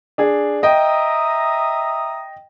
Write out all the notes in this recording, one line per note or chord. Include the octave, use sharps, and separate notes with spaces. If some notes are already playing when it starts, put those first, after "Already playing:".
D4 G#4
D#5 E5 G5 A#5 D#6